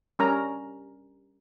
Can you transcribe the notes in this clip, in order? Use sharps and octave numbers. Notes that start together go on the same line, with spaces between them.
G3 C#4 A#4 A#5